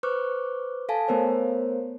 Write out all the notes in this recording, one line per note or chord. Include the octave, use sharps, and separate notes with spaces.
B4 C5 C#6 D6 F6 F#6
A4 F5 G#5 A5
A3 B3 A#4 C5 C#5